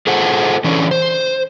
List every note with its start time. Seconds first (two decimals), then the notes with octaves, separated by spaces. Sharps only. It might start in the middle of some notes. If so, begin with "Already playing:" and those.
0.07 F4 G#4 A4 C5 F#5
0.64 E3 C#4 D4
0.91 C5